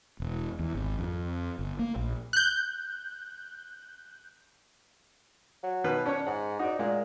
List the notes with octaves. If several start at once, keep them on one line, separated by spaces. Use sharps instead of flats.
E1
E2
G#1
F2
G1
A#3
A#1
F#6 G6
F#3
B2 D#3 B4
C#4 D4 C#5
G#2 F#5
D#4 F#4 D5
A#2 G#3